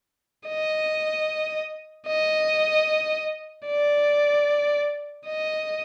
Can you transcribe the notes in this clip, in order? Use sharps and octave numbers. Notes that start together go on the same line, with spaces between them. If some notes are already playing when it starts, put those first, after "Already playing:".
D#5
D#5
D5
D#5